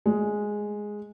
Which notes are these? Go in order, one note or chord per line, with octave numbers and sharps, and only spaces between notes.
G#3